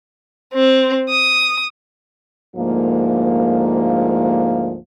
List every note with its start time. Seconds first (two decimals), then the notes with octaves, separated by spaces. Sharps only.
0.54 C4
1.10 D#6
2.56 D2 G#2 F3 A#3